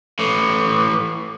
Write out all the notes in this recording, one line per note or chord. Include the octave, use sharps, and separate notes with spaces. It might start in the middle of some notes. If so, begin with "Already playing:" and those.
A2 E3